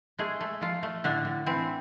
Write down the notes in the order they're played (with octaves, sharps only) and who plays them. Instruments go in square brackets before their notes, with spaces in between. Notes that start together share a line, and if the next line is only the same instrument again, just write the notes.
[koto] G#3 A3 G#4
A3
F3 A3 F4
A3
A2 D3 D4
A2
E3 C4